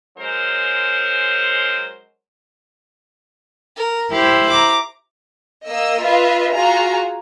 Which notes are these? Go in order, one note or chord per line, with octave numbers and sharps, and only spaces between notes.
F#3 G#3 C#4 A#4 C5
A#4
E4 G4 C5
A#5 D6
A#3 D#5 E6
F4 B4 D#5 E5
F4 F#4 G#4 A#5